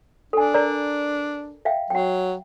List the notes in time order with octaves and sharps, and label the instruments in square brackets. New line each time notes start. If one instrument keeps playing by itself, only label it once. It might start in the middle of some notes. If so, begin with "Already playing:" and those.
[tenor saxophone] D4 [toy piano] A4 G#5
[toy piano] A#4 D5 A#5
E5 F5 G5
[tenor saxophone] F#3 [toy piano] F#5 G5